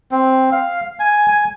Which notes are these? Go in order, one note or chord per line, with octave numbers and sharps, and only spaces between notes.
C4
F5
G#5
G#5